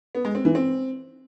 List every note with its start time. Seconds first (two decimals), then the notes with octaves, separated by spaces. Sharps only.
0.15 B3
0.25 G#3
0.35 C4
0.45 E3
0.55 C4